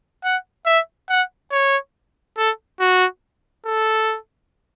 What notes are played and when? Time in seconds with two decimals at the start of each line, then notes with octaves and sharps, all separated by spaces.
0.24 F#5
0.66 E5
1.09 F#5
1.51 C#5
2.38 A4
2.80 F#4
3.66 A4